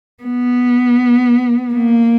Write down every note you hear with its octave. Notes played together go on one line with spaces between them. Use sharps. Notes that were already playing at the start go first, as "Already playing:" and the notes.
B3
A#3